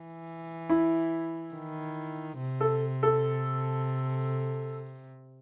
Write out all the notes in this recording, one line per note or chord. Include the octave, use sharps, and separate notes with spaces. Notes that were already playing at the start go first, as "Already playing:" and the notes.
Already playing: E3
E4
D#3
C3
A4
A4